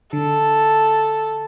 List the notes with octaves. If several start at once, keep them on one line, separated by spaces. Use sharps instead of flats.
D3 A4